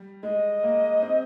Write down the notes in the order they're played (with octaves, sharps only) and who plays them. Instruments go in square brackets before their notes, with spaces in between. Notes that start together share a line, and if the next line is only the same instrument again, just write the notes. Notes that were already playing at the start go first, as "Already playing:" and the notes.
Already playing: [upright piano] G3
[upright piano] G#3 [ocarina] D#5
[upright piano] A#3
C4